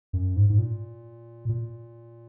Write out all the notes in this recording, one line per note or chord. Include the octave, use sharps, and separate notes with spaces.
F#2
G#2
G#2
A#2
A#2